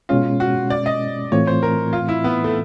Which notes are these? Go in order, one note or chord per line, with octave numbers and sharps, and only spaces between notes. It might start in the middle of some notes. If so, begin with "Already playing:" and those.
B2 G#3 C#4 F4
F#4
D5
D#5
A2 E3 A3 C4 F4 C#5
C5
A#4
F4
E4
B3
A3